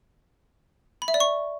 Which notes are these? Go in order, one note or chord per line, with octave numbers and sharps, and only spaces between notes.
B5
E5
D5
C#6